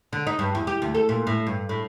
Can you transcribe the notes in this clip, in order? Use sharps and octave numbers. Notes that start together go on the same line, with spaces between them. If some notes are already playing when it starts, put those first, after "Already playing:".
D3
D#4
G2
E2
G4
D2
A4
A#2
A2
G2
A2